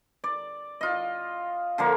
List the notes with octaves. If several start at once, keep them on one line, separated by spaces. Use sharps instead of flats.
D5
F4 D#5
D3 F3 A#3